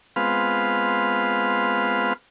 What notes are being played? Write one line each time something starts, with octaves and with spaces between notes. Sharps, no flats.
G#3 B3 C4 F4 B4 F5